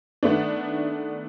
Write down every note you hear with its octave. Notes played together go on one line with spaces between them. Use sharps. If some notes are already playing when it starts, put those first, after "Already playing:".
D#3 A3 B3 D4